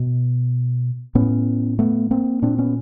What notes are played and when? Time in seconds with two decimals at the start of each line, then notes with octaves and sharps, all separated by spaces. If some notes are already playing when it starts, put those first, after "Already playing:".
Already playing: B2
1.15 A2 B3 C#4
1.79 A3 B3
2.11 A#3 C4
2.42 A#2 C4 D4
2.58 B3 C#4